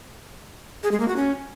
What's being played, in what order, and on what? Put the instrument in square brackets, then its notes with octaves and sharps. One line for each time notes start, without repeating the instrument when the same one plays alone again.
[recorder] G#4
G#3
A#3
F#4
C#4